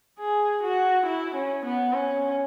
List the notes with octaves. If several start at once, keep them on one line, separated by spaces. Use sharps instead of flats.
G#4
F#4
E4
C#4
B3
C#4